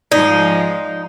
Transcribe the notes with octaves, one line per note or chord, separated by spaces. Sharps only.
G#2 F3 G#3 D#4 D5